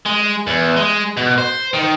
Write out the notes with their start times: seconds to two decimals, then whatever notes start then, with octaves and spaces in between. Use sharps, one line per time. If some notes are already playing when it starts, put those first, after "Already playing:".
0.06 G#3
0.47 E2
0.76 G#3
1.17 B2
1.38 C5
1.74 D#3